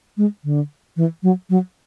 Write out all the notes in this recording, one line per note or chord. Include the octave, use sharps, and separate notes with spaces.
G#3
D3
E3
F#3
F#3